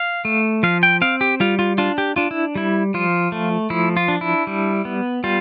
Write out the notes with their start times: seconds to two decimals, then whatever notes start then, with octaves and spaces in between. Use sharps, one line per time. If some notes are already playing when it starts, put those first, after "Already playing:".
Already playing: F5
0.25 A3
0.63 F3 F5
0.83 G5
1.01 C4 F5
1.21 G4
1.40 G3 F4
1.59 F4
1.78 D4 F4
1.98 G4
2.16 D4 F4
2.31 E4
2.55 G3 E4
2.94 F3 F4
3.32 A3
3.70 F3 E4
3.97 F4
4.08 D4
4.21 E4
4.47 G3
4.85 B3
5.24 G3 F4